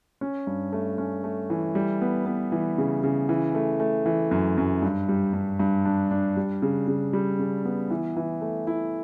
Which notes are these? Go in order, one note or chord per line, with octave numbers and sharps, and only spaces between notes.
C#4
G2
A3
C#4
A3
E3
G3
B3
B3
E3
C#3
C#3
E3
A3
A3
E3
F#2
F#2
G2
G3
G2
G2
D4
D4
G3
C#3
C#3
G3
C#3
B3
E3
E3
A3
E4